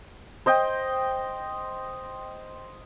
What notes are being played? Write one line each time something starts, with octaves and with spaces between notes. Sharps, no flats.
C5 D#5 G5